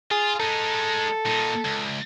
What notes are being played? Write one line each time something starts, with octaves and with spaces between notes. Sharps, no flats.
F4 G#4
G#3 D#4 A4
A#2 D#4
C#2